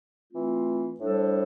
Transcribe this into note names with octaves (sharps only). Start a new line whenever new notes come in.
E3 A3 C4 F4
A2 G3 D4 A4 C5